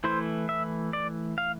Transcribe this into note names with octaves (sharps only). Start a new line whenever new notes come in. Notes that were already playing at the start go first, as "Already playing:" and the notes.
E3 A3 E4 C5
E5
D5
F5